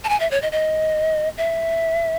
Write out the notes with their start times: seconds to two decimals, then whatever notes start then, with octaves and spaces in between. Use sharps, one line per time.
0.04 A5
0.09 G#5
0.20 E5
0.31 C#5
0.42 D#5
0.52 D#5
1.38 E5